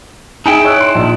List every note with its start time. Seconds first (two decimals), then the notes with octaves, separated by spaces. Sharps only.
0.46 D#4 E4 G#4 G5
0.65 C#5 E6 F#6
0.81 C6
0.95 A#1